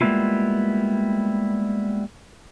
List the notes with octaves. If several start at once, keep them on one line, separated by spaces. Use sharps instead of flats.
G3 G#3 A#3 B3 E4 F4